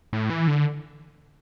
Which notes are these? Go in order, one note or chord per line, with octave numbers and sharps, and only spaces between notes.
A2
E3
D3